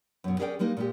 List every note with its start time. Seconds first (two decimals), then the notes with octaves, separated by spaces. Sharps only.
0.24 F#2 B2
0.39 C#4 G#4 A#4 D5 E5 G5
0.59 G3 G#3 A#3 D#4
0.77 A#2 G#3 G4